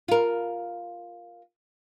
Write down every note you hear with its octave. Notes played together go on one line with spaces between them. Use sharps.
F4 A#4